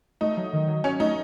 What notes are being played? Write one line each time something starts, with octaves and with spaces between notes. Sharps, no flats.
A3 D#4
F#3
D#3
F#3
F#3 C#4
A3 D#4